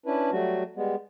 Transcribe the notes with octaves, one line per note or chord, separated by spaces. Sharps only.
C#4 D4 E4 B4
F#3 G3 A3 F#4
G3 G#3 B3